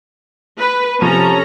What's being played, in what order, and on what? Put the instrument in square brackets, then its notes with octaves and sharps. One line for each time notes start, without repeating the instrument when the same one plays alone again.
[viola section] B4
[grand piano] C3 F3 D#7 [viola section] C#4 A4 A#5